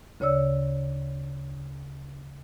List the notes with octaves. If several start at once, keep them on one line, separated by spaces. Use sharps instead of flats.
D2 C#3 C#5 D5 E6